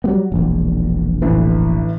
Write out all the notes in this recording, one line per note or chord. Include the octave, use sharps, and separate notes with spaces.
F#3 G3 B3
E1 A#1
A1 D3 E3